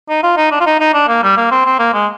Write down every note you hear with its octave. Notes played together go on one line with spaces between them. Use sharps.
D#4
F4
D#4
D4
F4
D#4
D#4
D4
A#3
G3
A#3
C4
C4
A#3
G#3